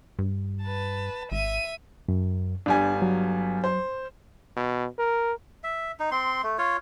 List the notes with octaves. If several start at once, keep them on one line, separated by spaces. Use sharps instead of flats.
G2
B4 A5
G#1 E5 D#7
F#2
G1 G3 D4 G#5
F#3
C5
B2
A#4
E5
D#4
C4 C6
A3
F4 C#5